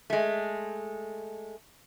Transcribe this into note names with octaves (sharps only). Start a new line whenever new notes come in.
G#3 A3